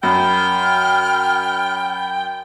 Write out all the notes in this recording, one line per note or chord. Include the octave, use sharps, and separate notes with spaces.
F#2 G5 B5 F6